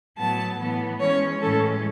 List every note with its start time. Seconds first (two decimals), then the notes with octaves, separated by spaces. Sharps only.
0.18 A2 F#3 B3 A5
0.59 A2 E3 B3
1.00 E3 G#3 C#4 C#5
1.40 A2 E3 G#3 C#4 A4